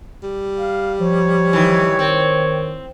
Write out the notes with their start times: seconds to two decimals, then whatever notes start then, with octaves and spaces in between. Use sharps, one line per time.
0.23 G3
0.58 F5
1.00 F3 C#5
1.53 D#3 E3
1.99 D#3 C4